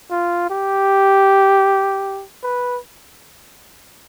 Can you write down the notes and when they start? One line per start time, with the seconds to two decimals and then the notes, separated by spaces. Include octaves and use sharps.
0.11 F4
0.50 G4
2.43 B4